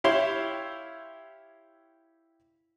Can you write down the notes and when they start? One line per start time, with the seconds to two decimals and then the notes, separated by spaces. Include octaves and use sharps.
0.04 E4 G4 C#5 E5 F5 C6